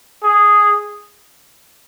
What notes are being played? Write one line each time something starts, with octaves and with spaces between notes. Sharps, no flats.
G#4